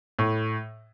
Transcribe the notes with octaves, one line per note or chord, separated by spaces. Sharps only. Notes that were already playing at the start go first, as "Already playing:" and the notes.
A2